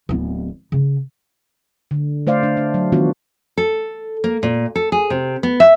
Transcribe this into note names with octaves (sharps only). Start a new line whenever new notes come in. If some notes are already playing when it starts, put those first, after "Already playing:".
D1 B3
C#3
D3
A3 C5 D5 F5
A3 D4
D4
F#3
D#3 E3 B3 D4 F4 F#4
A4
A#3
A#2
A4
G#4
C3
B3
E5